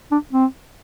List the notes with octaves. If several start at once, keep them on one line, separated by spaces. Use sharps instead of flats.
D4
C4